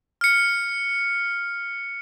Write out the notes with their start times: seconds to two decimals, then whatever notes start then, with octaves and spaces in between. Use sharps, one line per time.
0.21 F6 C#7